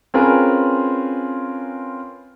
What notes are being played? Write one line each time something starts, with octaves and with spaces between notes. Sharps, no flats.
C4 C#4 F4 G#4 A#4 B4